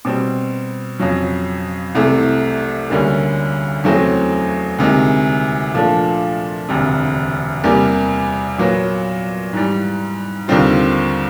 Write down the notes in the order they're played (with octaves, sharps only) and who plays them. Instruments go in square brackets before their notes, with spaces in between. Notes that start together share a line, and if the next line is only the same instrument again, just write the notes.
[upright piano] B2 G3 C4
F2 C#3 F#3
C2 C3 E3 A3
D2 D3 G3 A#3 C#4
E2 C#3 F#3 A3 C4
D2 C3 D#3 G#3
A#2 F3 A3 D4
E1 D2 C3
E2 C3 E3 G3 A#3
A#2 F#3 B3
G#2 E3 G3
D#2 D3 G3 C4 F4